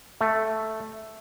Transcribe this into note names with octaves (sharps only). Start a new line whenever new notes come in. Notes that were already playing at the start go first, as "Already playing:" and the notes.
A3